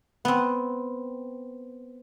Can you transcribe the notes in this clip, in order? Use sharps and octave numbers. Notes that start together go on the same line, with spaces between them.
B3 C4